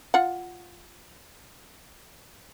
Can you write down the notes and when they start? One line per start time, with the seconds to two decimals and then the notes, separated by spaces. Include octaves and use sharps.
0.14 F4 F#5